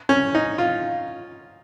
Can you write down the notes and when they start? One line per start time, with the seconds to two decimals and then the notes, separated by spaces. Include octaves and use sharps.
0.09 C#4
0.35 D#4
0.58 F4